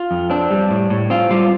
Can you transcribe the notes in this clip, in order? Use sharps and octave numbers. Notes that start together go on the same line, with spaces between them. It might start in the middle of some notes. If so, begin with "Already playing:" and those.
Already playing: F4
F2
C4 D4
G3
A2
A2
C4 F4
G3 F4